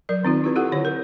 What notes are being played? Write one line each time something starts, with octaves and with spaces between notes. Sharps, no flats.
F#3 A#4 D5
D#3 C4 D#4 F4
E4 G4 B4
E4 F4 G4 A4 F#5
D3 C#5
A#4